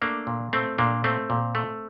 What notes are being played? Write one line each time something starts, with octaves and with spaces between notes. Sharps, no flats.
A3 A#3 D4
A#2
A3 C4
A#2 A#3 D4
A3 C4
A#2
A3